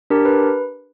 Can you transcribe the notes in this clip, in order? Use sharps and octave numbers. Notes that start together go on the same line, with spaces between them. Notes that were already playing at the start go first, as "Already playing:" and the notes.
D4 G4 A#4
B4